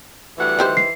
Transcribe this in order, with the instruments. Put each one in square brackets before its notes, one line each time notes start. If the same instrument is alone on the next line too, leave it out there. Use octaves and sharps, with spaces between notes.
[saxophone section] D2 G3 F#5 [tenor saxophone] E3
[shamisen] D#3 G4 C5
[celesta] C7